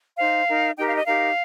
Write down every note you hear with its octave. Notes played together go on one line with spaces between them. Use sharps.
D#4 C5 F5
D#4 A#4
D#4 G4 A#4 G5
F5
D#5
D#4 G4 A#4 F5